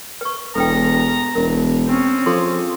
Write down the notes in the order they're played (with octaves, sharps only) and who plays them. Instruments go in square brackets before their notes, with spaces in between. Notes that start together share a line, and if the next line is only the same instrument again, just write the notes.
[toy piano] B4 C#6
[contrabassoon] E1 [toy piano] A4 B4 G5 [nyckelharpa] A#5
[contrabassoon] E1 [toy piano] A#4
[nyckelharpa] C4 C#4
[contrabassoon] F3 [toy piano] G#4 A4 C6